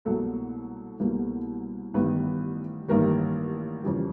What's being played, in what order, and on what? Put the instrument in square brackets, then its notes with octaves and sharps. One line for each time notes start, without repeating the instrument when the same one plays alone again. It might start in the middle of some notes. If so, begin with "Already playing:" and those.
[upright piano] C2 B2 F#3 A3 A#3 A4
C2 B2 F#3 A#3
A1 G2 D#3 G3 B3 B4
A1 G2 D#3 G3 A#3 A#4
F2 C#3 E3 G3